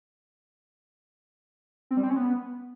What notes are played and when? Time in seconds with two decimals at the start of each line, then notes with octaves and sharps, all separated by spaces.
1.91 C4
1.97 G3
2.03 C4
2.10 C#4
2.16 B3